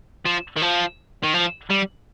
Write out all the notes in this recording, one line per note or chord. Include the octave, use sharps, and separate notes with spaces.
F3
D#3
F3
D#3
F3
G3